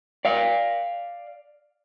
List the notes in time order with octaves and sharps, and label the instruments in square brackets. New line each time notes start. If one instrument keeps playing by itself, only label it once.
[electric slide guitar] D5 F5